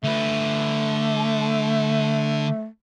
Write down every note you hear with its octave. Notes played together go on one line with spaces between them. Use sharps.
D3 A3 B4